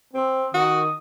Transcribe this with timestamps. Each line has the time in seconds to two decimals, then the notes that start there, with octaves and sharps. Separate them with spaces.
0.14 C4
0.54 D#3 F#4 D#6